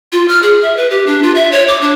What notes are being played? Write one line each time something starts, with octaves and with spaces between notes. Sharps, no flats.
F4
F6
G#4
E5
B4
G4
D4
F4
E5
C#5
D6
D4